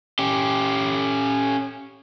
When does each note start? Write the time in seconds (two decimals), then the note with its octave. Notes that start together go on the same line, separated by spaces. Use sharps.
0.19 C#4 G4